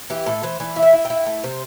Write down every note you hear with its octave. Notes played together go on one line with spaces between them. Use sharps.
E3 G4
A2 A4
E3 C5
E3 D5
E4
E5
E4
E4 G5
A3
C3 C5